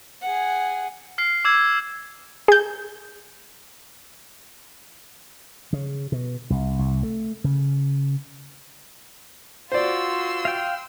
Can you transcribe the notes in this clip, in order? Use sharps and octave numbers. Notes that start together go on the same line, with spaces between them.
G#4 F#5
F6 C7
D6 E6 G#6
G#4 G6
C#3
B2
C2
C2
A3
C#3
F4 F#4 C5 D5 C6 E6
F5 G5